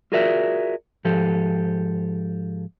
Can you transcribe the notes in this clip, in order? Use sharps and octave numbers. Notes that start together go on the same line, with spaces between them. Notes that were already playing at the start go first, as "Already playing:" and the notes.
F4 F#4 G#4 A#4 D5 E5
G#2 F3 G4 A4